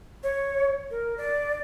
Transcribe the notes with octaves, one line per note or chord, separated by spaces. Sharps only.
C#5
A#4
D5